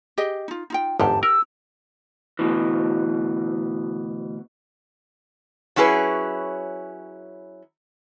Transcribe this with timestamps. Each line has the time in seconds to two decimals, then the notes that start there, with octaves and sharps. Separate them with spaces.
0.18 G4 G#4 D#5
0.48 D#4 F4
0.70 D#4 F4 G5
1.00 G1 E2 G#2 G4 A5
1.23 A#4 E6
2.39 D2 B2 E3
5.76 F#3 C#4 E4 G#4 B4